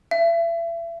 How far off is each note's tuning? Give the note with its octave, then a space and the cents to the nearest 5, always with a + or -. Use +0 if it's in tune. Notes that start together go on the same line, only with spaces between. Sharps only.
E5 +35